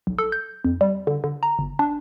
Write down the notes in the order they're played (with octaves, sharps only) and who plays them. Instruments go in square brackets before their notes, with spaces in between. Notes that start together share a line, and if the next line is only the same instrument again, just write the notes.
[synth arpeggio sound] B1
A4
G6
F2
G3
D3
D3
A#5
G1
D4